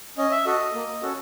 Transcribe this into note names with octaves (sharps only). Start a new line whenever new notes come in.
C#4 D#5
E5
F#4 A4 D#5
A#3
C#4 F#4 A4